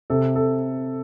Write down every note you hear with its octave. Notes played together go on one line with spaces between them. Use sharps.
C3 A4
A4